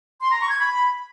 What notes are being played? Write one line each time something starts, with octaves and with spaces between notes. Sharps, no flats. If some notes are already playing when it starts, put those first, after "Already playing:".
C6
A#5
C#6
G#6
B5